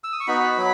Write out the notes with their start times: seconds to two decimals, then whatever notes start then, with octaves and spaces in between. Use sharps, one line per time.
0.04 E6
0.12 D#6
0.20 C#6
0.28 B3 D#4 F#4 B5
0.44 B5
0.58 F#3